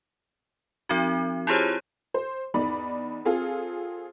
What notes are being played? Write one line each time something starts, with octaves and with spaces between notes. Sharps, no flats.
F3 C4 D#4 F#4
E4 F4 G4 G#4 C5 C#5
C5
E2 D#4 D5 B5
C4 F4 G#4 A4